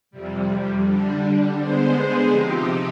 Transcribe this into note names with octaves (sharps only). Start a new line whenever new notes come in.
F2 C3 G3
D3 G3 D4
D3 G#3 B3 C5
G#4
C3 F3 C4 D#4 G4